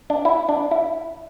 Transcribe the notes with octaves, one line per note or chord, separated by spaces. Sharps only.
D4
E4
D4
E4